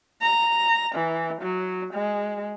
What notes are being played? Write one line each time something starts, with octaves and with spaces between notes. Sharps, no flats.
A#5
E3
F#3
G#3